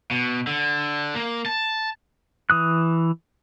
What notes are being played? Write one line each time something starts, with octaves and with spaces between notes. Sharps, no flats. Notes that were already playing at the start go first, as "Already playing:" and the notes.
B2
D3
A#3
A5
E3 D#6 F#6